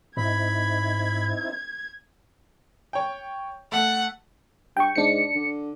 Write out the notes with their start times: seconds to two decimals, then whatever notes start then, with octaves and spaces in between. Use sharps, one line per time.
0.17 G#2 C4 D#4 E4 B5 G#6
2.93 C#5 G5
3.72 A3 F#5
4.77 G2 G5 C#6
4.96 G#2 D4 C#7
5.35 D3